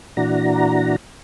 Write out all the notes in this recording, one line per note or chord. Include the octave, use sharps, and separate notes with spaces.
A#2 E3 D4 F#4 A#5